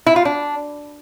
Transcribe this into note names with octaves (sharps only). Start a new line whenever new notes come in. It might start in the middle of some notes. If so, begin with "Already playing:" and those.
E4
F4
D4